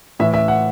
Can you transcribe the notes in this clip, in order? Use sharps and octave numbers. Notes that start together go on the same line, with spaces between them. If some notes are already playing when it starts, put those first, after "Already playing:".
A2 E3 E5
E5
F#5